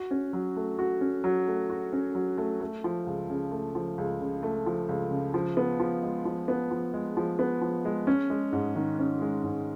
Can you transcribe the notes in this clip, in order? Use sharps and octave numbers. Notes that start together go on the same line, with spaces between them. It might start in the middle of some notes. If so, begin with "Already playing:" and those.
Already playing: F#4
C#4
F#3
A3
F#4
C#4
F#3
A3
F#4
C#4
F#3
A3
A3
F3
C#2
C#3
A3
F3
C#2
C#3
A3
F3
C#2
C#3
F3
B3
F3
G#3
F3
B3
F3
G#3
F3
B3
F3
G#3
C#4
G#3
G#2
D#3
C#4
G#3
G#2